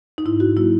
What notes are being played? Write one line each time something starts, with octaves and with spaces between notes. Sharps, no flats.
D#4
G#2 E4
F#4
F#3 A#3 E4